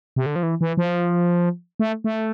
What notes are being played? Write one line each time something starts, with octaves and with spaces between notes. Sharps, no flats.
C3
D3
F3
E3
E3
F3
A3
A3